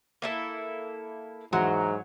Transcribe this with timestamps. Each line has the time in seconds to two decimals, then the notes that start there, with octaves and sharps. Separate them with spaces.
0.22 A#3 E4 A4
1.53 E2 G#2 F#3 F#4 A#5 C6